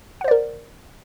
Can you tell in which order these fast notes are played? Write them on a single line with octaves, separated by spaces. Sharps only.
F#5 C5 D5 A#4